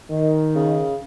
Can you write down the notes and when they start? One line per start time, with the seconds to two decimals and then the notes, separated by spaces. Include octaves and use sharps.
0.10 D#3
0.55 C#3